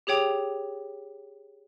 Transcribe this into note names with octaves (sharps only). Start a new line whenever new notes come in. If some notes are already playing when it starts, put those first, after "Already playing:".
G4 G#4 C#5 G5 D6 F7